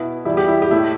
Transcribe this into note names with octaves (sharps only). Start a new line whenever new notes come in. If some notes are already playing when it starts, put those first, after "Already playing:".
Already playing: B2 B3 E4
E2 B2 G3 E4
G4
E4
G4
A2 A3 E4